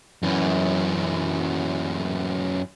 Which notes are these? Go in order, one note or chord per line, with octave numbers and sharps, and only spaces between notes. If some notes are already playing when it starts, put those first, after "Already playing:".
F#2 E3